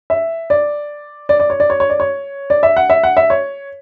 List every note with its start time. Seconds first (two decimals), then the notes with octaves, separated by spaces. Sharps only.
0.10 E5
0.50 D5
1.29 D5
1.40 D5
1.50 C#5
1.60 D5
1.70 C#5
1.80 C#5
1.90 D5
2.00 C#5
2.50 D5
2.63 E5
2.77 F#5
2.90 E5
3.04 F#5
3.17 E5
3.30 C#5